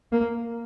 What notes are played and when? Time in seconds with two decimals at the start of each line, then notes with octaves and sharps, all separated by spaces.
0.12 A#3